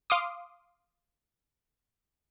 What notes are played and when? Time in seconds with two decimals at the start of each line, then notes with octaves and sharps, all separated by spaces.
0.10 F5 C6 D6 D#6